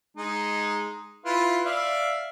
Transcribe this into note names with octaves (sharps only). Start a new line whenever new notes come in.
G#3 D#4
E4 F4 B4
D5 E5 F5